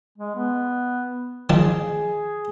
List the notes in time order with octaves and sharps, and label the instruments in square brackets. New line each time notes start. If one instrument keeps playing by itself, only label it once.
[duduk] G#3
B3
[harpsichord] D#3 F3 A5 [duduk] G#4